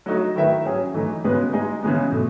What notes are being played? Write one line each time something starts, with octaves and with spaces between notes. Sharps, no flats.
F#3 A3 D#4 F#4
D#3 A3 E4 B4 E5
F#3 C#4 G#4
E3 A3 D#4
C#3 G#3 B3 F#4 B4
G#3 D#4 G#4 D#5
C#3 E3 G#3 B3
B2 A3